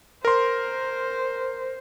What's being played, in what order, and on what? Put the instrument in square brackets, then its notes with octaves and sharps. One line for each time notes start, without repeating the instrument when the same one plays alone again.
[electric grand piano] A#4 C6 [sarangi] C5